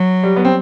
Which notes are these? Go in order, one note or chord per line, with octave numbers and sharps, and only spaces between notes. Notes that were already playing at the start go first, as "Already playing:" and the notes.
Already playing: F#3
G3
B3
C4